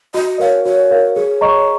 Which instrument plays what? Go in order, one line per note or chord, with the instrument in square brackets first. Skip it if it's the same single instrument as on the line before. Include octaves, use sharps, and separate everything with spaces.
[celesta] F#4 [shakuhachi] D#5
[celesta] A#4 F5 [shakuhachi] C#5
[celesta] F#4 [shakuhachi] C#5
[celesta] A#4 F5
[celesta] G#4 [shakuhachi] C#5
[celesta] D#5 A#5 C#6